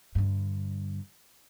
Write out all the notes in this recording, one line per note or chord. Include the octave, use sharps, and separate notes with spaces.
G2 D3